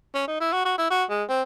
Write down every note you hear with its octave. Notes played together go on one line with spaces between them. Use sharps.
C#4
D#4
E4
F#4
F#4
E4
F#4
G#3
C4